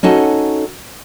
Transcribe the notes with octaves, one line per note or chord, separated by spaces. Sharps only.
C#4 D#4 F#4 A4